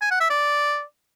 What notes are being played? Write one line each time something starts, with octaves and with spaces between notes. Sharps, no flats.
G#5
F#5
E5
D5